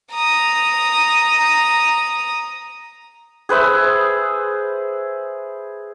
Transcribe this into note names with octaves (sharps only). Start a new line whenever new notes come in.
A#5 D#6
G#4 B4 C5 E5